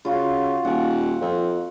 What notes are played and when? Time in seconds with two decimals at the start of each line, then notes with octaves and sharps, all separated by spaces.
0.05 C#3 F4 F#4
0.65 D#1 F#5
1.21 F2